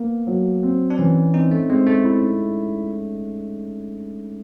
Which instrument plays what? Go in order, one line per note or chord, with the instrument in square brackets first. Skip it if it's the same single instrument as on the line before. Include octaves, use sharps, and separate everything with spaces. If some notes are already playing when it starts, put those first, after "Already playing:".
Already playing: [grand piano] A#3 [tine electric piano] B3
[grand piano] F#3
C4
[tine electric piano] D4
[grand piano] E3 [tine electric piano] C#4
[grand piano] C4 [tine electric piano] D#4
[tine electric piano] A3
[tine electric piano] G#3 [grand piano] C4
[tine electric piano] A3
[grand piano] E4